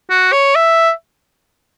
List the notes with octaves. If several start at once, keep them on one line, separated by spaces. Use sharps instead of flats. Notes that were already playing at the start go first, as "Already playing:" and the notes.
F#4
C#5
E5